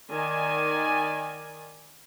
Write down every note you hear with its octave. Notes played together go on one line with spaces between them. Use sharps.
D#3 D5 G#5